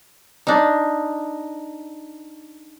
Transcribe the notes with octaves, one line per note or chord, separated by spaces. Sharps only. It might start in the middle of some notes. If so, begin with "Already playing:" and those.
D4 D#4